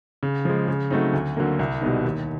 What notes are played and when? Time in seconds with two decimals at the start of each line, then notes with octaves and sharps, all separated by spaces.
0.23 C#3
0.45 F3 G#3
0.68 C#3
0.90 F#3 A3 C4 D#4
1.13 D2
1.36 D3 F#3 A#3
1.59 C2
1.82 B2 G3 B3 D#4
2.05 D#2